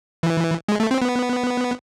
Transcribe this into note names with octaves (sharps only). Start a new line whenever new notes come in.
E3
G#3
A3
C4
B3